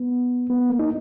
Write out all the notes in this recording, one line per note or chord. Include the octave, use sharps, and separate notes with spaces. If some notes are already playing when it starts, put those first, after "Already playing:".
Already playing: B3
B3
A#3
D#4